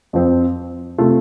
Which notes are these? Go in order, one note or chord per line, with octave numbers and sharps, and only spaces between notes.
F2 F3 C4
C3 A3 F4